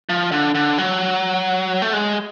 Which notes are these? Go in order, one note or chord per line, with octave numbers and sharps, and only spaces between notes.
F3
D3
D3
F#3
A3
G#3